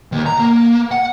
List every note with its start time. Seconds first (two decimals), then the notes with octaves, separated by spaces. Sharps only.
0.12 D#2
0.26 A#5
0.39 A#3
0.91 F#5